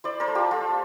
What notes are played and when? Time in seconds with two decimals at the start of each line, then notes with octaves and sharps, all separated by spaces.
0.04 E4 C5 D5
0.20 A#4 C5
0.28 A3
0.35 F4 G4
0.51 A3 F4